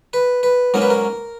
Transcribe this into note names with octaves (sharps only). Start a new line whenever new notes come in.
B4
B4
G#2 F#3 A#3 C#4 A#4
B4
A#4